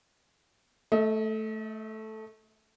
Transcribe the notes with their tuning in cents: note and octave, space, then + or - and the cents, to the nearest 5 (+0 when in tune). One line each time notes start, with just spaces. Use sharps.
A3 -5 D#5 +40